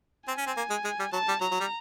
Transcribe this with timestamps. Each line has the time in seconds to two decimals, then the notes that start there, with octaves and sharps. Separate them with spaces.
0.28 C4 G#5
0.38 C#4
0.47 C4
0.57 A#3
0.70 G#3
0.84 G#3
0.99 G3
1.13 F#3 A5
1.28 G3
1.41 F#3 A#5
1.51 F#3
1.60 G3